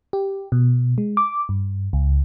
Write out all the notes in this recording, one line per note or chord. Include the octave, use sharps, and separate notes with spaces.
G4
B2
G#3
D6
G2
C#2